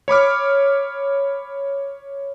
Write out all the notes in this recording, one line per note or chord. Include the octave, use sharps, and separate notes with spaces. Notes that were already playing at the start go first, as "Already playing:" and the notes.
C#5 B5 D6 F6